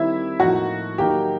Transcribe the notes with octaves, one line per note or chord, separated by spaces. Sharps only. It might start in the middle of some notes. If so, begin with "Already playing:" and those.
Already playing: D#3 G3 C4 E4 E5
A2 F3 A#3 D#4 F#4 F#5
D#3 F#3 A#3 D#4 G4 G5